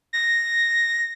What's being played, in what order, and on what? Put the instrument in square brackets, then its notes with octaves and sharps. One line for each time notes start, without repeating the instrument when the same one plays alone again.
[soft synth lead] A#6